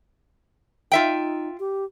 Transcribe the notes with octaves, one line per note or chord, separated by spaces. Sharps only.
D#4 F4 E5 G5
G4